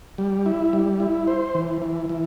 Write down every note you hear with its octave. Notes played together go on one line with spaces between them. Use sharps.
G3
E4
G3
E4
C5
E3
E3
E3